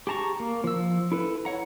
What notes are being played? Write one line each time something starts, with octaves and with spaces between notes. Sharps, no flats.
G4 G#4 A5 A#5 C#6
A#3
F3 E6
E4 A4 B4
C#5 F#5 A#5